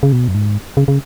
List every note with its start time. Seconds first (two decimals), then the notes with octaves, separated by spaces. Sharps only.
0.03 C#3
0.13 B2
0.28 F#2
0.35 G#2
0.77 C#3
0.88 C#3